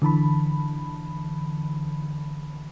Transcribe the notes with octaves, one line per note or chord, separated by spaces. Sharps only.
D3 E3 A5 B5